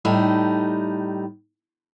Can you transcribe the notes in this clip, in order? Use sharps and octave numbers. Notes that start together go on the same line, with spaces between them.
A2 G3 D#4